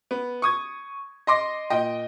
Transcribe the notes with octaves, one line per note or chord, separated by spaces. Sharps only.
B3
C#6 D#6 G#6
D#5 C6 D6 A#6
A#2 D#5 G5